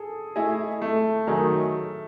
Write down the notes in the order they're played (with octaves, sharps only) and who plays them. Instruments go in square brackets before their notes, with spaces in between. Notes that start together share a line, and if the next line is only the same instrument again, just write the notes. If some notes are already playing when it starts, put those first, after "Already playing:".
Already playing: [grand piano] G#4 A4
[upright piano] A3 E4 G#4 D#5
[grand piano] A3
[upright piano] D#3 F#3 A3 D#4 G#4